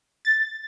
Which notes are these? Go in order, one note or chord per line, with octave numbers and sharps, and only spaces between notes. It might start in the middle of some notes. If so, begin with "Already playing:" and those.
A6